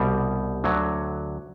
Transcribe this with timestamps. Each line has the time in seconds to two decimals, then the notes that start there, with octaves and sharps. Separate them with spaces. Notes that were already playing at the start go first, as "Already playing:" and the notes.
Already playing: C2 B2 G3
0.64 D2 D3 F#3